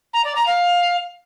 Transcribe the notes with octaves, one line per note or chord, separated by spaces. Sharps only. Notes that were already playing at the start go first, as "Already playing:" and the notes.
A#5
D5
A#5
F5